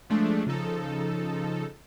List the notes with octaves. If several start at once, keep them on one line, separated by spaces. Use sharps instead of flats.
F3 G#3 A3 D4
C#3 F3 D#4 A4